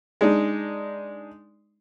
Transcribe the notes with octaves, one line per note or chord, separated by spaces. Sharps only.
G#3 D4 D#4